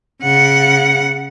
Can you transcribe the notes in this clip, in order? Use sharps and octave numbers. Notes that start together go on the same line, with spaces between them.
C#3 F#5